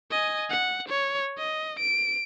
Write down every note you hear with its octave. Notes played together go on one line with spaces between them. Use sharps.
D#5 G#5
F#5
C#5
D#5
D7